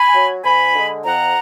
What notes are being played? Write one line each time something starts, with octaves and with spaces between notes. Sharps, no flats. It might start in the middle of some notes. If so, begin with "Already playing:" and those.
Already playing: G#5 B5
F#3
D2 G#5 B5
D3 G#3
F2 F#5 A#5